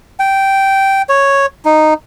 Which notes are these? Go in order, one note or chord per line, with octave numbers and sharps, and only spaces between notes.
G5
C#5
D#4